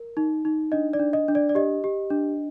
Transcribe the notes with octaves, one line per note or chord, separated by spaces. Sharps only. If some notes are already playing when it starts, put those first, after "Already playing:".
Already playing: A#4
D#4
D#4
D4 D#5
D5
D4
D#5
D4
D5
D5
G4 D#5
G4
D4